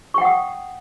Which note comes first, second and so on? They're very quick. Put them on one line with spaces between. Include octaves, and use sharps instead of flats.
C#6 G5 F#5 D#6